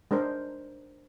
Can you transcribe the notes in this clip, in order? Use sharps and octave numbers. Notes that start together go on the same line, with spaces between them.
G#3 D4 A#4 C5